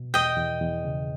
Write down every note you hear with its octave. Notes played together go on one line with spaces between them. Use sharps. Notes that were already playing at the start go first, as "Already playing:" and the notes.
Already playing: B2
E2 D#5 G5
E2
E2
C#3